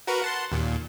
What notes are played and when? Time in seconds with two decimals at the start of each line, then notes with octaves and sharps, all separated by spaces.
0.07 F#4 A#4 B4
0.22 F#5 A5 C6
0.52 D#2 A#2